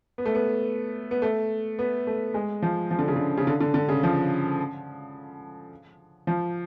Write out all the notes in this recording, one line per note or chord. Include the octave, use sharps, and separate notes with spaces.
B3
A3
B3
B3
A3
B3
A3
G#3
F3
F3
D3
C#3
D3
C#3
D3
D3
D3
C#3
F3
F3